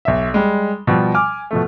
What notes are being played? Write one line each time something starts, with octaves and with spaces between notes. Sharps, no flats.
B1 E5
G3 G#3
B2 F3 G3
G#5 D6 F6
B2 F3 A3